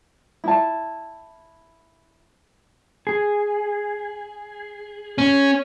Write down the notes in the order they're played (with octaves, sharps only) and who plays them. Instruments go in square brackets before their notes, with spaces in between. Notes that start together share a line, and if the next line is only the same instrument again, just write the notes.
[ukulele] E4 A5
[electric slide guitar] G#4
[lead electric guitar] C#4